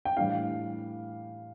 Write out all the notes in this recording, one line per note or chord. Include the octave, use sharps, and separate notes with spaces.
G5
A2 E3 G3 D4 F5